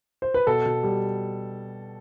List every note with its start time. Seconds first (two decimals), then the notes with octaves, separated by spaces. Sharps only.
0.22 C5
0.34 B4
0.47 B2 A4
0.66 B2
0.83 G3